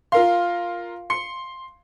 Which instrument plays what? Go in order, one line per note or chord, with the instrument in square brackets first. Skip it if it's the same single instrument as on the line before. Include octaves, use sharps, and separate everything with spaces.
[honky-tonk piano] F4 A#4 C6 [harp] F5
[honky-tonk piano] C6 [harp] C#7